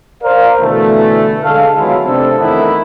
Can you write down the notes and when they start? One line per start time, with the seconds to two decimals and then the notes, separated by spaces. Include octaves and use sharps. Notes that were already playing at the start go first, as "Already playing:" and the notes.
0.22 A#4 C5 D5 F5
0.60 B2 D3 E3 A3
1.43 D3 G#3 A4 F5
1.77 D#3 F#3 G#3 B3 E4 F4
2.05 C3 A3 C4 D4 A4
2.39 F2 D#3 E3 A3 B3 E4